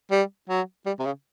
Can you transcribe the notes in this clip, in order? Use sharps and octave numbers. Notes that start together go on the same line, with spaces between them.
G3
F#3
G3
C3
C#3